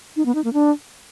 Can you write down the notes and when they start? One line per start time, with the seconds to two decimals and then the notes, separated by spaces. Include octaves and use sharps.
0.16 D#4
0.26 B3
0.35 D#4
0.44 A#3
0.53 D4